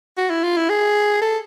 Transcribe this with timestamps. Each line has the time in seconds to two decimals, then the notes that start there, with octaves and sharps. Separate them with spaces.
0.18 F#4
0.30 E4
0.44 F4
0.57 E4
0.70 G#4
1.22 A4